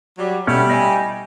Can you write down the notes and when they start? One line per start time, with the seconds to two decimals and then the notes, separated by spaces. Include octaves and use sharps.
0.17 F#3 G3
0.47 B2 G3 A3 C#4 E4
0.70 D#5 G#5